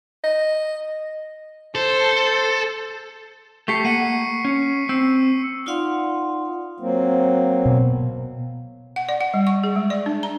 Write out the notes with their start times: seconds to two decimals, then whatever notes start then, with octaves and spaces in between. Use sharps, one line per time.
0.24 D#5
1.75 A4 C5
3.68 A3 G4 A4 C#6 B6 C7
3.85 A#3 F#5 C7 C#7 D#7
4.45 C#4
4.89 C4 E6
5.66 D#4 F4 D5 F5 F#5 C6
6.80 F#3 A#3 C4
7.65 B2
8.96 F#5
9.09 D5
9.21 F#5
9.34 G3
9.47 C#6
9.64 G#4
9.76 G#3
9.90 D5
10.06 D4
10.23 A#5